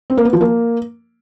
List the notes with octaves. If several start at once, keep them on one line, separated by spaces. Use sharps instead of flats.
C4
A#3
B3
F3
A#3